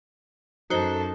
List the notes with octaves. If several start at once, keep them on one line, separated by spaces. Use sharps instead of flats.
F#2 D#4 F#4 A4 C5